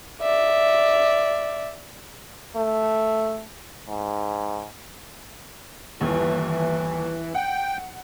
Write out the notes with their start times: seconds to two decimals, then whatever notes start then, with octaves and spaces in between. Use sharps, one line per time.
0.22 D5 E5
2.56 A3
3.88 G#2
6.01 G1 D#2 E3
7.34 F#5 G5